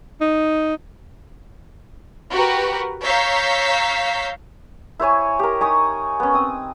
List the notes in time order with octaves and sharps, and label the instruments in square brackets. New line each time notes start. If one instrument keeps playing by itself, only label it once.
[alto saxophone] D#4
[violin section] F#4 G4 A#4 B4
C#5 F5 A#5 E6 G6 B6
[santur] E4 C5 C#5 G#5
G4 A#4
D#4 G#5 C#6 D#6
B3 C#4
C4 D#6